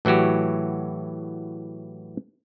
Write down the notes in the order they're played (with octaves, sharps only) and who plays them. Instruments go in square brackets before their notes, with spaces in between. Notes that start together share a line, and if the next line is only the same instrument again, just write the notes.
[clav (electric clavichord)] A2 E3 F#3 F#4 G4